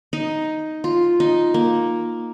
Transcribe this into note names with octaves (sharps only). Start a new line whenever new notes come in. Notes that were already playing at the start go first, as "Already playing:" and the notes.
D#4
F4
D#4
A#3